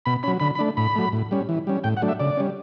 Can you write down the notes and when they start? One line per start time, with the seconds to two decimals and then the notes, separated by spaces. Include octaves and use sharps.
0.06 B2 B5
0.23 F#3 C#4 B5
0.40 D3 B5
0.55 B5
0.59 A3 D4
0.77 A2 B5
0.96 F#3 A3
1.12 A2
1.31 G3 C#4
1.49 E3
1.67 G3 C#4
1.84 A2 G5
1.97 F#5
2.02 F#3 A3 D4
2.08 E5
2.20 C#3 D5
2.37 G3 C#4